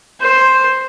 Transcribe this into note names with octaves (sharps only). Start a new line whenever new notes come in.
C5